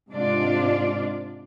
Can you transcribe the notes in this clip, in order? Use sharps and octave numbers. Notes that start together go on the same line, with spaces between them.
G#2 C3 G#3 D4 F4 D5